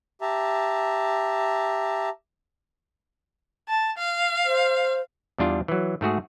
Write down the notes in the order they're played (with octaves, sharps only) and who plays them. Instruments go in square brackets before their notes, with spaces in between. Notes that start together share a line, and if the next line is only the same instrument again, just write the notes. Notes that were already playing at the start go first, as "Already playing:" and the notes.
[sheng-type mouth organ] G4 E5 A5 A#5
[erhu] A5
F5
[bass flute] C5
[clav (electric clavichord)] E2 G3 D4 F4
E3 F#3
G#2 A3 F#4 G#4